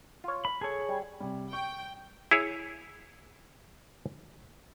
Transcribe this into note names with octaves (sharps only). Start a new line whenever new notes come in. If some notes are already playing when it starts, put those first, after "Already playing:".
F4 C#5
B5
G#4 A4 C#5
G3
C3 G3
G5 C#6
E4 G#4 C#5